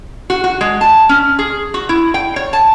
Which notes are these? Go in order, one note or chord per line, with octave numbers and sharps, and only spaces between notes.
F#4
F#4
G#3
A5
C#4
G#4
F#4
E4
G5
C#5
A5